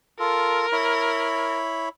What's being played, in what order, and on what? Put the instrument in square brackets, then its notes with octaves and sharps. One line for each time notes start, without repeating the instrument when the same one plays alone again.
[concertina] F4 A4 [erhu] A#4
[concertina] E4 C#5 B5